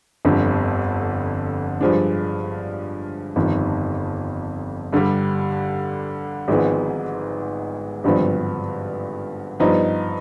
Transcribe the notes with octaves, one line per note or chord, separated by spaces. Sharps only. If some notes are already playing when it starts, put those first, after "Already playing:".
G1 F2 D3
G2 F3 G#3 D4
G1 F2 D#3
G2 D3 G3
G#1 G#2 F3 G#3 B3
G#1 G2 D3 F3 B3
G2 F3 B3 D#4